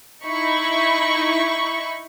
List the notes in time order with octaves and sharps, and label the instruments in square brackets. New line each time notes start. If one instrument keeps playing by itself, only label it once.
[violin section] D#4 E4 B5 C#6